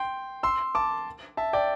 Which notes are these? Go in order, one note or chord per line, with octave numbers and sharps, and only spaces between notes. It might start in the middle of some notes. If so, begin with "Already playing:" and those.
Already playing: G5 C6
C6 E6
A5 D6
E5 A5
D5 G5